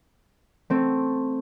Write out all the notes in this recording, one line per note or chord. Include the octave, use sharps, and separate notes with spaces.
A3 C4